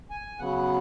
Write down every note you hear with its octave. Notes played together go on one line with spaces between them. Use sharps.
G#5
C#3 F#3 B3 F#5